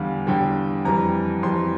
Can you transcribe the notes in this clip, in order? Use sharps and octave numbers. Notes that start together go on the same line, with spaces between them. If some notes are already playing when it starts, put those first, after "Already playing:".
Already playing: E2 D3 G3 F5
E2 D3 G3 G5
F2 E3 G3 A#5
F2 E3 G3 C6